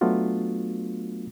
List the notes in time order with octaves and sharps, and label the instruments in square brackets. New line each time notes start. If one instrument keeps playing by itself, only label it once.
[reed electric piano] F#3 A3 B3 D4 F4 F#4